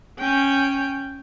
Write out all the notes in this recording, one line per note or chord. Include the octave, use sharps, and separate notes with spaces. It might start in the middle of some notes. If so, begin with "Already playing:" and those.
C#4 G5